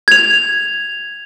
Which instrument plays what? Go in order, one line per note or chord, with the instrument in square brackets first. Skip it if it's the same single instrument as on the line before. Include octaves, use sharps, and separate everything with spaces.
[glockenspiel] G#6 F7